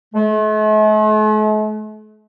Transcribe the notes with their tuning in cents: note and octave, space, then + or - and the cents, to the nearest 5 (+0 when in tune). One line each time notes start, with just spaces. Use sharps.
A3 -45